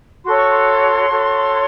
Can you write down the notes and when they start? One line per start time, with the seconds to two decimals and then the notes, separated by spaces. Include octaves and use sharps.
0.25 F#4 A4 C#5 C6
0.37 C#6
0.50 C6
1.09 F#4 A4 C#5